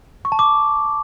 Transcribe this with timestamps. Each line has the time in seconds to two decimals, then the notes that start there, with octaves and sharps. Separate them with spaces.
0.25 C#6
0.32 A5
0.39 D6